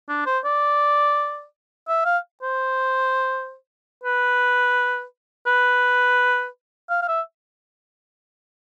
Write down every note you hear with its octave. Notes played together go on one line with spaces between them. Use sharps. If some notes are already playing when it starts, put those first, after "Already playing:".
D4
C5
D5
E5
F5
C5
B4
B4
F5
F5
E5